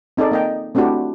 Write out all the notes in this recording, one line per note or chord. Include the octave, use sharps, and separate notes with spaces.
C4 D#4 G#4 A4 D5
A#3 D#5 G5
A3 C4 D4 E4 F#4 G4